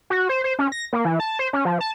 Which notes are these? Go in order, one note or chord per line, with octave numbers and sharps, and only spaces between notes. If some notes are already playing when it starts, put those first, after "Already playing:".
F#4
C5
C5
C#4
A#6
A#3
E3
A5
C5
C#4
F3
A5